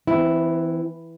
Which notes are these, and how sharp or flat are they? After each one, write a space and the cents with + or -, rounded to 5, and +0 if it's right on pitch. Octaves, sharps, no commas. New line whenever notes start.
E3 +0 C4 -35 E4 +0